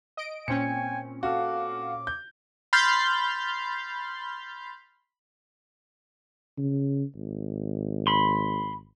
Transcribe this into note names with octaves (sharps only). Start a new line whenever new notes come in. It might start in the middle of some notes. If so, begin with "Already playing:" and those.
D#5 D7
A#2 C4 C#4 G5 G#5 C#7
F#4 A4 F5 D6
G6
B5 C6 F6 G6 A6
C#3
G#1
B5 C6